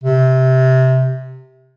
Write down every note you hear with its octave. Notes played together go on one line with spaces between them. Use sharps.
C3